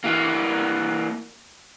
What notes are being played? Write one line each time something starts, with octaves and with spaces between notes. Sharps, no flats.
E3 A#3